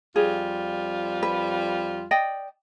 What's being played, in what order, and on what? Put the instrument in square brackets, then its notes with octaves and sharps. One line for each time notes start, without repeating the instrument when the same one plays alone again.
[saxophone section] F2 G3 F4 [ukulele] G#4
[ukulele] B4
D5 D#5 G5